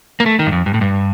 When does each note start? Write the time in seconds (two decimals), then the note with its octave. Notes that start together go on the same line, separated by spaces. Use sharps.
0.20 A#3
0.26 A3
0.39 D#3
0.47 G2
0.52 F2
0.66 G2
0.74 A2
0.81 G2